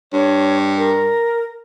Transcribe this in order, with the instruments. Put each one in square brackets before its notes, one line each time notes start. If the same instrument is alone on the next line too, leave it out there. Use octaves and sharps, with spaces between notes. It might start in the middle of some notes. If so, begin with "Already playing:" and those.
[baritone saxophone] G2 [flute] C#5
[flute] A#4